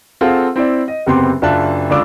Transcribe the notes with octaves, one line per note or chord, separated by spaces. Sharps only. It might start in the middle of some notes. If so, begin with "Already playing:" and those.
C4 F4 G#4 A4 F5 F#5
C4 E4 D5
D#5
F#1 C3 B3 C4 G4 C6
F#1 D4 F4 E5 A5 F#6
C#2 D3 D4 F4 D6 E6